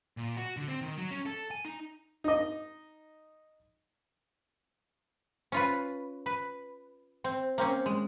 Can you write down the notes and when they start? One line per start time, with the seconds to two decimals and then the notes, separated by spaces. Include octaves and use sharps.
0.17 A#2
0.37 F#4
0.57 D3
0.68 C4
0.81 D#3
0.98 F#3
1.11 C#4
1.26 A4
1.51 G#5
1.65 D#4
2.24 D#4 D#5
5.52 C#4 F4 B4
6.26 B4
7.24 C4
7.58 A#3 C4 C#4
7.86 G#3